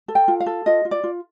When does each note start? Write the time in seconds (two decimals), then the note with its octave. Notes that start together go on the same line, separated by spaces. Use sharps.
0.08 A4
0.15 G5
0.28 F4
0.40 F5
0.46 A4
0.66 F4 D#5
0.85 F4
0.91 D5
1.04 F4